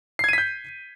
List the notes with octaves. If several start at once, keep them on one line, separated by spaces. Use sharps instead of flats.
G6 G#6 B6 C7 D#7